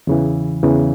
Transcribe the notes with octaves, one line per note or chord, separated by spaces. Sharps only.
E2 C#3 E3
E2 C#3 E3